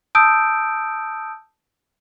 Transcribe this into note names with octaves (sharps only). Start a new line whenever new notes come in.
A5 D#6 E6 G6 D7